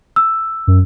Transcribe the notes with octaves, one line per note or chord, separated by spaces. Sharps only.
E6
F#2